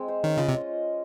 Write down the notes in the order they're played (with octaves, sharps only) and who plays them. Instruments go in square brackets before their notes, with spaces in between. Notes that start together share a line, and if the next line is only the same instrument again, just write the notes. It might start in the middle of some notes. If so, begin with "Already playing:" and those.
Already playing: [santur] G#3 C4
C5
[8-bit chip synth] D#3 [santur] C#4
[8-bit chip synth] C#3 [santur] F4
[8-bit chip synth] C3
[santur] D#5